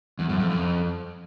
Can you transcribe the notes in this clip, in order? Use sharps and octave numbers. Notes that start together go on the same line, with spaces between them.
E2
F#2
F2
F2